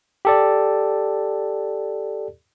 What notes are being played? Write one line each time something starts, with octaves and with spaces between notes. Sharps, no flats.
G4 A4 D5